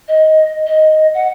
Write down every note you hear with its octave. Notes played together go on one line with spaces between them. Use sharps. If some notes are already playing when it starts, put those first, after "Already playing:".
D#5
D#5
F#5